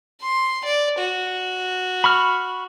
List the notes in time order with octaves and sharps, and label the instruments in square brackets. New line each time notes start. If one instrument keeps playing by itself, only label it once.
[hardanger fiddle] C6
D5
F#4
[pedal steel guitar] B5 C#6 F6